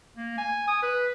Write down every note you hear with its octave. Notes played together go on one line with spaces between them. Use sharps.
A#3
G#5
D#6
B4